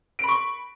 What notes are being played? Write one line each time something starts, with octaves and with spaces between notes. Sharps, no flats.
B5 C#6 D7